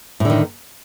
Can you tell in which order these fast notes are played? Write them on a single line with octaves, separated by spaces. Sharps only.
A2 D3 D#3